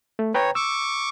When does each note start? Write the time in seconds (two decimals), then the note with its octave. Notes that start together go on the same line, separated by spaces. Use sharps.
0.19 A3
0.34 B4 C#5 G5 A#5
0.55 C#6 D6 E6